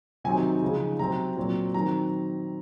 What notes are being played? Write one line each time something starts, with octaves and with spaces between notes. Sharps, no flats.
C3 D#3 F#3 C4 D#4 G#5
C#3 F3 G#3 D#4
C3 F#3 C4 A#5
A#2 F#3 C4
D#3 F#3 C4 A#5